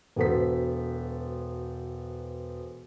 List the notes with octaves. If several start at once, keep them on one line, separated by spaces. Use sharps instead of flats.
E1 B3 F#4 A4 C5 B6